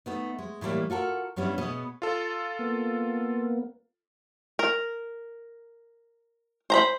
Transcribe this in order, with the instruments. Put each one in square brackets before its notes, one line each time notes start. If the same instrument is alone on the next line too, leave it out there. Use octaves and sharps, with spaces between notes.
[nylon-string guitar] A3 B3 D#4
G#3
A2 E3 F3 G3 A#3
F4 F#4 A4 A#4
G2 G3 B3 C#4 E4
B2 B3 G#4 D#5
[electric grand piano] F4 A4
[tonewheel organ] A#3 B3
[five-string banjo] A#4
C5 A#5 B5